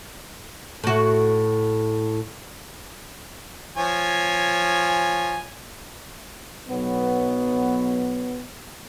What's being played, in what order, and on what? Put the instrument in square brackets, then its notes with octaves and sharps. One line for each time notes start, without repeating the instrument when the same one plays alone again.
[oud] A2 F#4
[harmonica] F3 C#5 G#5
[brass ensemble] B1 F#3 B3